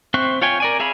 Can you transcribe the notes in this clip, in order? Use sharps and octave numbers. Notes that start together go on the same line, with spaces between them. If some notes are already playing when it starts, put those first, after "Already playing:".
C4 C5 E5 C#6 F#6
F4 C#5 G5 G#5
A#4 D5 G#5
G#4 E5 F5 G#5 B5